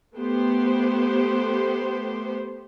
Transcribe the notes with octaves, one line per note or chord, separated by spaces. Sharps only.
A3 B3 G4 C5